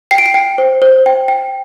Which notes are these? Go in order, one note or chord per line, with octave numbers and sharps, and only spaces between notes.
G5 C7
D7
C7
G5
C5
C5
G5
G5